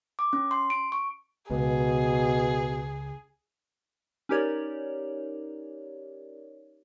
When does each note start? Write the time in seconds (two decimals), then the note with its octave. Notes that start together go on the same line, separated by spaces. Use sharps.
0.19 D6
0.33 C#4
0.51 C6
0.70 D7
0.92 C#6
1.51 C#2 B2 G#4
4.29 C#4 D#4 G4 A#4 C#5 D5